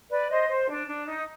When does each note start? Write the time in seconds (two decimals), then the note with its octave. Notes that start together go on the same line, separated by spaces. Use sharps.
0.09 B4 D5
0.29 C5 D#5
0.49 C5
0.68 D4
0.87 D4
1.07 D#4